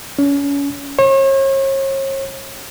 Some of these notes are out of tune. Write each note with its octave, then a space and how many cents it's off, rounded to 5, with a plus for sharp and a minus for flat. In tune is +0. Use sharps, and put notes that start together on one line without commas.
C#4 +30
C#5 -40